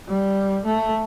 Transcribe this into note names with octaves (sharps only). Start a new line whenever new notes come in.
G3
A3